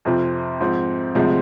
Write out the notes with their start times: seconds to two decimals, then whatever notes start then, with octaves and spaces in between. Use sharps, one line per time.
0.05 F2 C3 F3 C4 F4
0.61 G#2 F3 C4
1.15 D2 C3 F3 G#3 C4